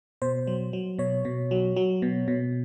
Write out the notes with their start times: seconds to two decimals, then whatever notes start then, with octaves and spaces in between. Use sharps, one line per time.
0.22 B2 C5
0.47 F#3
0.73 F#3
0.98 B2 C#5
1.25 B2
1.51 F#3
1.76 F#3
2.02 B2
2.28 B2